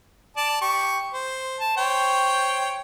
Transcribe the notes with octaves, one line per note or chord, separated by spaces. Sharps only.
D5 A5
G4 C#6
C5
A5
C5 C#5 G5